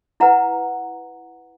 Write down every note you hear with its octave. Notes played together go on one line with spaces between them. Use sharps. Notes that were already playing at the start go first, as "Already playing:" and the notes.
E4 B4 F#5 A#5